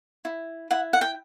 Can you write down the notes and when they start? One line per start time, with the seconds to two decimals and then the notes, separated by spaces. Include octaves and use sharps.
0.25 E4
0.71 E4 F#5
0.93 F#5
1.01 G5